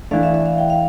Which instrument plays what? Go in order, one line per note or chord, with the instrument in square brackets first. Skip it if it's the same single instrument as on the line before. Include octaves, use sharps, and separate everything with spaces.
[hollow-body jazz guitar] E3 A3 D4 [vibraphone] F5
[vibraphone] E5
E5
F5
G5
F5